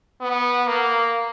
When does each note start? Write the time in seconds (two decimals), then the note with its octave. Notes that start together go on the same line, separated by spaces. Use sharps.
0.21 B3
0.67 A#3